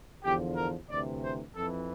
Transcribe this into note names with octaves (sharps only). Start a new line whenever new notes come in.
E2 D3 F3 G4
A#4
D2 C3 E3 D5
C5
F2 E3 A4